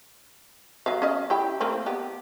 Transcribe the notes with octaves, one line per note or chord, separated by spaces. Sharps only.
F#3 E5 F5
C#4 D#5
E4 G4 G5
A3 A#3 C4
B3 G4